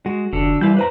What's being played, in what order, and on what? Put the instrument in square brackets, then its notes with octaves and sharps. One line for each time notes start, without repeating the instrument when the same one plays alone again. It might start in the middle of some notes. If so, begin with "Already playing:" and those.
[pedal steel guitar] G#3 [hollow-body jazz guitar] F#4
[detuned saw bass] F1 [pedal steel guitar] D3 A4
[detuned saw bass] E3 [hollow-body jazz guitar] G3 E4 [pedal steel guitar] F5 G6
[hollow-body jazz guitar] B4 C5 A#5